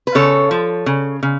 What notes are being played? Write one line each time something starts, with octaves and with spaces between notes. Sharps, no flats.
B4
C#3 A4 C#5
F3
C#3
C#3